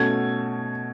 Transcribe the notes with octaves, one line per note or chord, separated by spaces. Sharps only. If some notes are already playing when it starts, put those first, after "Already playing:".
Already playing: B2 A3 C#4 F#4 A4 G#6